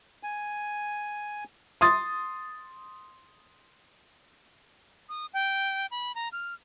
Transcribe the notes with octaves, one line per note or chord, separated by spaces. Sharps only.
G#5
C6 D#6 A6
D#6
G5
B5
A#5
F6